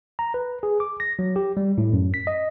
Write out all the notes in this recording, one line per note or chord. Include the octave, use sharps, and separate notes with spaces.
A#5
B4
G#4
D6
A#6
F#3
G4
G3
A2
F#2
B6
D#5